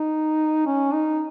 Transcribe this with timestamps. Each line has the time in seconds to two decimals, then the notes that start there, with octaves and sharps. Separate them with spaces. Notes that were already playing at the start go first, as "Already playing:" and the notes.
Already playing: D#4
0.66 C#4
0.92 D#4